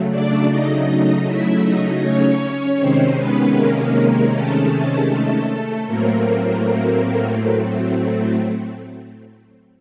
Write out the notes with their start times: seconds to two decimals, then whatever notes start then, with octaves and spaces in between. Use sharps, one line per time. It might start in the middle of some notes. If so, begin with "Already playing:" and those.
Already playing: C#3 F#3 A3
0.11 D4 D5
0.50 D#4 D#5
1.27 E4 E5
1.64 D#4 D#5
2.03 C#4 C#5
2.80 C3 D#3 G#3 C4 C#4 C5
3.18 B3 B4
3.56 A#3 A#4
4.33 A3 A4
5.10 A3 A4
5.87 A2 F#3 A3 A#3 C4 A#4